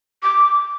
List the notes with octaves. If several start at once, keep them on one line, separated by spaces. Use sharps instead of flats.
D6